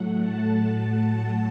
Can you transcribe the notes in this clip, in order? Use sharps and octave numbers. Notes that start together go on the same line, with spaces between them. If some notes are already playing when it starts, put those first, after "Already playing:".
Already playing: A2 F#3 A3 F#5
A5
A5